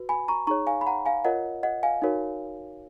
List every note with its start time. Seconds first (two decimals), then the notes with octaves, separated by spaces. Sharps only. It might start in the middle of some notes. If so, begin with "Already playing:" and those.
Already playing: F#4 B4
0.09 G#5 B5
0.28 A#5 C#6
0.47 D#4 G#4 C#5 A#5 C#6
0.67 F5 G#5
0.81 B5
0.86 F#5 A#5
1.06 F5 G#5
1.25 F4 A#4 C#5 D#5 F#5
1.63 D#5 F#5
1.83 F5 G#5
2.02 D#4 F#4 A#4 C#5